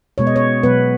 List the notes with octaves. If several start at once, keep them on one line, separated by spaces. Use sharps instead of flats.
B2 G#3 B3 C#5
D#5
C#5
B2 F#3 B3 B4